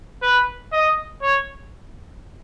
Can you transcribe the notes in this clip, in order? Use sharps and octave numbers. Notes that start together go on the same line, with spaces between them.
B4
D#5
C#5